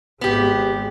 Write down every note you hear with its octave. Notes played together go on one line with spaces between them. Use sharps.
G#1 G#3 B3 G4